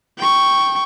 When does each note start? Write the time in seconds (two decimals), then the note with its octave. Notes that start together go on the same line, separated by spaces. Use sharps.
0.18 G5 C#6